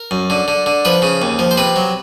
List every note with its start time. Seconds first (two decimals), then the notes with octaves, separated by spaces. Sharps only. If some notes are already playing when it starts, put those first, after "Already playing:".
Already playing: A#4
0.11 F#2
0.30 D3
0.48 D3
0.66 D3
0.85 F3 B4
1.02 C#3
1.22 D#2
1.39 F3
1.51 C5
1.57 C3 B4
1.76 F#3